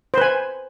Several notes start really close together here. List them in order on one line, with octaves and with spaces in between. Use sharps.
C5 B4 G#5